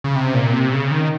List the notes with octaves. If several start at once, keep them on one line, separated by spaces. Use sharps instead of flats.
C#3
C3
A#2
C3
C#3
D#3